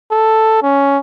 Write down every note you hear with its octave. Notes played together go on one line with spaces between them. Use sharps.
A4
C#4